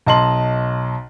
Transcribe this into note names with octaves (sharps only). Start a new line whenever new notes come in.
B1 D#5 A5 C6 F#7